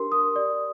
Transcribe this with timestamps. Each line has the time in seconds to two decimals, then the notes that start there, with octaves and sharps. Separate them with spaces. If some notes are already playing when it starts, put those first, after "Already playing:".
Already playing: D4 G4 A#4 C6
0.12 D#6
0.36 G4 D5